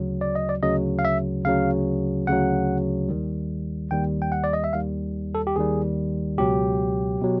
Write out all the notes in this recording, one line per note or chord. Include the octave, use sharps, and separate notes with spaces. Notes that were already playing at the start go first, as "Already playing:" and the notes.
Already playing: D2 C#3 F#3
D5
D#5
D5
D2 C#3 F#3 D#5
F5
E5
D2 C#3 F#3 F5
D2 C#3 F#3 F#5
D#2 D#3 G3
D#2 D#3 G3 G5
G5
F#5
D5
D#5
E5
D#2 D#3 G3 F5
A4
G4
D#2 D#3 G3 G#4
C#2 B2 F#3 G4
B2 F#3